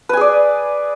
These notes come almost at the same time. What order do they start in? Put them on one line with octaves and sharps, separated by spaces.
B4 G#5 G#4 D5